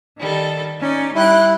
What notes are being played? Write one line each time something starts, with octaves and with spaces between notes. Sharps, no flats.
D#3 G3 A4
C#4 D#4 D5
G3 E4 G5 F#6